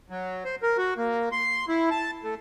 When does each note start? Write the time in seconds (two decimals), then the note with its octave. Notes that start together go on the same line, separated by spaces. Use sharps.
0.10 F#3
0.45 C5
0.63 A#4
0.78 F#4
0.97 A#3
1.32 C6
1.68 E4
1.91 A5
2.23 A3